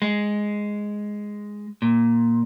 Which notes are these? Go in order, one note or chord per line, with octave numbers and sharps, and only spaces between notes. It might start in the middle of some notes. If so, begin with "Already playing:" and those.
G#3
A#2